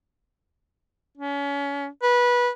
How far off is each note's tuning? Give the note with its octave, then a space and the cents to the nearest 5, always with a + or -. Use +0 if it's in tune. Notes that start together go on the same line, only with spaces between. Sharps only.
C#4 +30
B4 -20